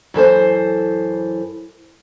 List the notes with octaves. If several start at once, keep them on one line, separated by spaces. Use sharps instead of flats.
F#2 E3 A4 C5